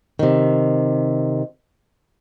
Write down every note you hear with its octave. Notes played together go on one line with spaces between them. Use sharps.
C3 D#3